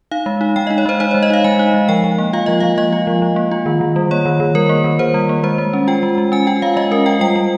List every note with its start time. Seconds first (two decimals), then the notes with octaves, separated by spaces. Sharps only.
0.11 D#4 F5
0.26 G#3
0.41 D#4
0.56 G#3 G5
0.67 D#5
0.70 D#4
0.78 C#5
0.85 G#3 C5
1.00 D#4 C5
1.11 C#5
1.14 G#3
1.23 D#5
1.30 D#4 F5
1.44 G#3 G#5
1.59 D#4
1.74 G#3
1.89 F3 G5
2.04 F3
2.18 A#3
2.33 F4 F5
2.46 F3 D#5
2.60 F3 F5
2.78 A#3 D#5
2.92 F4
3.07 F3
3.22 F3
3.36 A#3
3.51 F4
3.66 D#3
3.81 D#3
3.96 G3
4.11 A#3 C#5
4.26 D#3
4.40 D#3
4.55 G3 A#4
4.69 A#3
4.84 D#3
4.99 D#3 C5
5.14 G3
5.29 A#3
5.43 G#3 C5
5.58 G#3
5.73 C#4
5.88 F4 G5
6.03 G#3
6.18 G#3
6.32 C#4 G#5
6.47 F4 G5
6.62 G#3 F5
6.77 G#3 D#5
6.91 C#4 A#4
7.06 F4 G5
7.21 G3 G5
7.36 G3